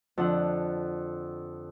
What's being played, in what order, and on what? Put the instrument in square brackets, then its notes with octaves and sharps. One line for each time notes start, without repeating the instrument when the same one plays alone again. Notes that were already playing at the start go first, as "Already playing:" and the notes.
[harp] F2 D3 D4 F#5